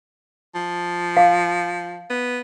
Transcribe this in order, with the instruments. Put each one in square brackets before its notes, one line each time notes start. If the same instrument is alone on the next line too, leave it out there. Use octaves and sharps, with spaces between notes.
[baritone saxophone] F3
[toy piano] F5
[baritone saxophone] B3